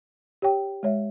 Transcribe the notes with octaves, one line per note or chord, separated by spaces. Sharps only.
G4 C#5 G5
G#3 C#5 E5